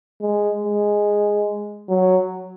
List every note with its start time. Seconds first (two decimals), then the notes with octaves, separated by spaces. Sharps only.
0.21 G#3
0.64 G#3
1.89 F#3